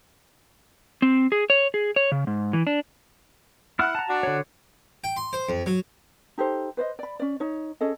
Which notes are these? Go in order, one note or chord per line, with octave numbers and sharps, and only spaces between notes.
C4
G#4
C#5
G#4
C#5
C#3
G#2
E3
D4
E4 F#5 F6
A5 A#5
D4 F#4
D3 C#5
G5
C6
C5
F2
F#3
D#4 G4 A4 C5
B4 C5 D5 D#5
D5 B5
C#4 D5
D#4 C#5
C#4 G#4 A4 D#5